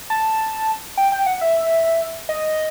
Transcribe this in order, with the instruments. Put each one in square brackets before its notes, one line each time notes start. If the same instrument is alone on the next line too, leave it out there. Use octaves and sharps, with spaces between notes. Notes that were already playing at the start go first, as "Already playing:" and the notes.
[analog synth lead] A5
G5
G5
F#5
E5
D#5